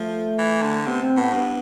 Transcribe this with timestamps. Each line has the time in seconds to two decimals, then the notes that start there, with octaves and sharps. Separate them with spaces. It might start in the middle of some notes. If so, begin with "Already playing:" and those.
Already playing: F3 A3
0.38 E3
0.62 D3
0.85 C3 B3
1.02 C4
1.17 A2 B3
1.33 G2 B3